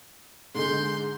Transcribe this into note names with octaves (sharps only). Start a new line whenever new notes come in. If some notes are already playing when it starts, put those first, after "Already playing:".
G#2 D3 G#3 C6 G6